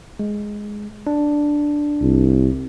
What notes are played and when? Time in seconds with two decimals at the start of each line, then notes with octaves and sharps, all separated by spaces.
0.19 G#3
1.07 D4
2.01 C2